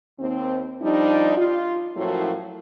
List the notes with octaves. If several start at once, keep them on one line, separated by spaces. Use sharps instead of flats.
D#2 C4
F3 G3 D4 D#4
F4
F#2 A2 F3 F#3 A#3 E4